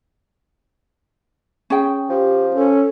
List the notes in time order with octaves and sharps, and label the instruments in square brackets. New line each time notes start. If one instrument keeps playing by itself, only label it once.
[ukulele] C#4 G#4 G5
[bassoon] F3 [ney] G4
[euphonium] C#4 [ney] A4